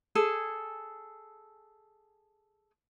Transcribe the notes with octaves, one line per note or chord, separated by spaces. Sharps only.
G#4 A4 G#5